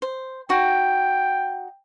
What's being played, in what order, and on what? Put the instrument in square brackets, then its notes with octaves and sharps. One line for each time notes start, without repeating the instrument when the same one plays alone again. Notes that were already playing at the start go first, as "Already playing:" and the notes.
[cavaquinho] C5
[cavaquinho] D#4 F#4 [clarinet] G5